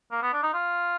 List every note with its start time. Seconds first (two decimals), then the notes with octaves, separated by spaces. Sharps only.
0.11 A#3
0.23 B3
0.33 D4
0.43 D#4
0.54 F4